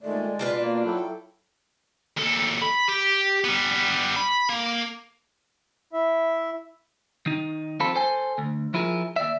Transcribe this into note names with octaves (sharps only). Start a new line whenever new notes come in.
A#2 D#3 G#3 A3 D5
B2 D4 F4 B4
A#3
F#3 E4 A4 G5
D#2 A4
B5
G4
G3 B3
B5
A#3
E4 E5
D#3 D#4
F2 C4 F4 A4 B5
A4 C5 G#5
D2
F3 E4 F4 G#4 A#4
D#2 D5 E5